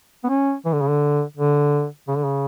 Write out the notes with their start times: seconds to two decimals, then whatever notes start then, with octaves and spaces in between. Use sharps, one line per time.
0.24 B3
0.29 C#4
0.65 E3
0.73 D3
0.81 C#3
0.88 D3
1.37 D3
2.08 C#3
2.16 D3
2.24 C#3